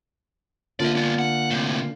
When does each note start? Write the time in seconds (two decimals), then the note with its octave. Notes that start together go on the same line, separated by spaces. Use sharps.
0.80 D3 A#3 F4 D5 E5
0.95 B3 D4
1.19 F#5
1.51 A2 C3